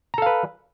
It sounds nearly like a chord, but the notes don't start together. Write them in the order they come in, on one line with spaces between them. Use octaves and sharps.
A#5 A4 F5 B4